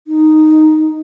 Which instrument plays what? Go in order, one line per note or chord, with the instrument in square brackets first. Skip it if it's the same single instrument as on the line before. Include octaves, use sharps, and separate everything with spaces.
[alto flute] D#4